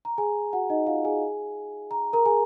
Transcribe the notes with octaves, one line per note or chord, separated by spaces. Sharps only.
A#5
G#4 G#5
F#4 F#5
D#4 D#5
F4 F5
G#4 G#5
A#5
A#4 A#5
G#4 G#5